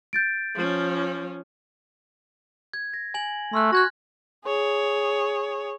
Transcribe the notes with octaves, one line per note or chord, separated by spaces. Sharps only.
G6 A6 D7
F3 C#4
G#6
A#6
G#5 F#7
A3 C6 F6 F#6
F#4 F#6 G#6 A#6
G#4 C#5